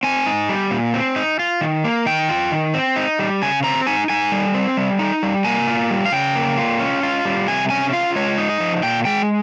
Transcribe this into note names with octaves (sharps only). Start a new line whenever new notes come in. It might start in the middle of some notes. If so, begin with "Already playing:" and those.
C4 G#5
D#4
G3
A#2
C4
D#4
F4
D#3
A#3
D#3 G5
F4
D#3
C4
D#4
G3
C#3 G#5
C4 A#5
D#4 G#5
D#4 G#5
G3
C4
G3
D#4
G3
A#3 G#5
F4
G3
F5
C#3 G5
A#3
F4
C#4
F4
G3
C3 G#5
C#4 G#5
F4 F5
G#3 C#5
D#4
D#5
F3
A#2 G5
G#3 G5